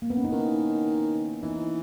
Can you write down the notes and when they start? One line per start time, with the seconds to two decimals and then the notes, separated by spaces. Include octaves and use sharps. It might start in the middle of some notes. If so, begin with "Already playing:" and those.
0.02 A#3
0.10 B3
0.17 C#4
0.24 D#4
0.32 D#3 C#4 E4
1.43 E3 B3 D#4